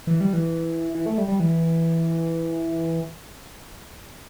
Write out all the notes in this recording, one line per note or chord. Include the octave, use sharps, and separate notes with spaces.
E3
G3
E3
E3
A3
G3
G3
E3